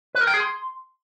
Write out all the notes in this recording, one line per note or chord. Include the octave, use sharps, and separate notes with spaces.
B4
A#4
G5
G#4
C6